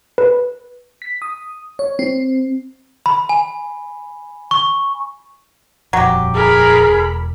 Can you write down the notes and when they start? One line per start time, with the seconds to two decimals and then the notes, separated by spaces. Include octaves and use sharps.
0.18 B4
1.02 B6
1.22 D#6
1.79 C#5
1.99 C4
3.06 B5
3.29 G#5
4.51 C#6
5.93 D#1 F2 F#3 G4
6.35 G#4 A#4 B5
6.88 E1